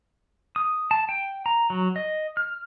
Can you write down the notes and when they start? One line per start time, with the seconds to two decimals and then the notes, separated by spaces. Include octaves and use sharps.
0.56 D#6
0.91 A5
1.09 G5
1.46 A#5
1.70 F#3
1.96 D#5
2.37 F6